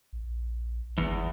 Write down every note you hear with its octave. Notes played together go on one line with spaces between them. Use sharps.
A#1
G1 E2